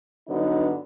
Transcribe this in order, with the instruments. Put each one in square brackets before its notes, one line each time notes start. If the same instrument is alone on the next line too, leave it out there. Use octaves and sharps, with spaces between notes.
[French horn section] G2 D3 F#3 B3 D#4